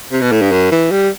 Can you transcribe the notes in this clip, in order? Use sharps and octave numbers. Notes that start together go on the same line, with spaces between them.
C3
B2
A2
G2
F#2
E3
G3